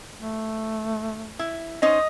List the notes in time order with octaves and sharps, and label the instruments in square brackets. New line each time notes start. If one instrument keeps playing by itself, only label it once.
[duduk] A3
[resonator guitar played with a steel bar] E4
[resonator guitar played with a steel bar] C#4 D#4 C5 [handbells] D#5 D#6